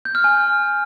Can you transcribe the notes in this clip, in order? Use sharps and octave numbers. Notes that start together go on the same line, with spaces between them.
G6
F6
G#5